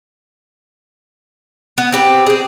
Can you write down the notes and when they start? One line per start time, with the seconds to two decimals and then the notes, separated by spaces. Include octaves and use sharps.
1.78 B3
1.92 C4 G4 B4
2.26 C4 G#4